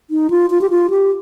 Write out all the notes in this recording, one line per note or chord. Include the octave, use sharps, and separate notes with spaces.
D#4
F4
F4
G4
F4
G4